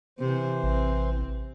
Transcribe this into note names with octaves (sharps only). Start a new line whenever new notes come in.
C3 E3 C5
A1 C4